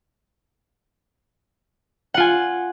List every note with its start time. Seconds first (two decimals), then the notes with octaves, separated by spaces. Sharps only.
2.14 F#5
2.17 F4
2.20 G#5